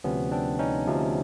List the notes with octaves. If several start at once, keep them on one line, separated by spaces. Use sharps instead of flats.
D2 C3 F3 B3 C#4
C4 D4
C#4 D#4
D2 C3 F3